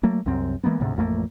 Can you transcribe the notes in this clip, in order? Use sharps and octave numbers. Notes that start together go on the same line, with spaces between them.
F#3 A3 A#3
C2 F#2 C4
E3 G#3 A#3 B3
D2 G#2 C3
A1 F2 A3 A#3